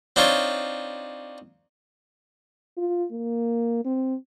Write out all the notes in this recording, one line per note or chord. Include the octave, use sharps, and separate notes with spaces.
C4 D4 D#4 F4 C#5
F4
A#3
C4